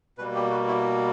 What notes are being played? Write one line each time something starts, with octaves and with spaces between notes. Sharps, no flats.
B2 G3 A#3 B4
G4
F#4
E4